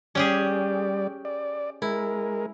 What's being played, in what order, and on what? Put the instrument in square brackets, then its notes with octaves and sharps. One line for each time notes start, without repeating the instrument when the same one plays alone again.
[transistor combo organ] G3 D5 [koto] C#4 G4 G#4
[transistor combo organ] D5
[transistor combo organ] G#3 A#4 [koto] E4